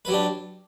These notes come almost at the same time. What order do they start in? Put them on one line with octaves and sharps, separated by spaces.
B4 F#3 G4 D4